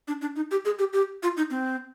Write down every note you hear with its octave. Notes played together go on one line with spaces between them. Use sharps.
D4
D4
D#4
G4
G#4
G4
G4
F4
D#4
C4